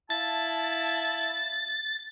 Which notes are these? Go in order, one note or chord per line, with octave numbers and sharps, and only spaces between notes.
E4 F5 A5 A6